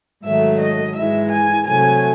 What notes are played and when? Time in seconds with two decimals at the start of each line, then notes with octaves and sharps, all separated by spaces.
0.24 G#2 D#3 F#3 A3 E5
0.59 D#5
0.95 G#2 E3 G#3 E5
1.30 G#5
1.65 C3 F#3 A3 G#5